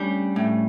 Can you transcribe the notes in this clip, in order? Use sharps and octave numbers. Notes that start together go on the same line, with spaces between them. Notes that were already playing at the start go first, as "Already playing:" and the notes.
Already playing: G3 A3 C#4 D4
A2